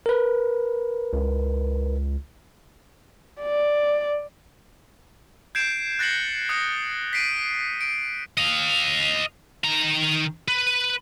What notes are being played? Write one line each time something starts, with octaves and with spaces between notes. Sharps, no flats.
A#4 B4
C#2
D5
G6 G#6 C7 D7 E7
F#6 A6 A#6 C7 C#7 F#7
D#6 F#6 A#6 C#7
B6 C7 D7 D#7
D7
D#5 F5
D#3 A#5
B4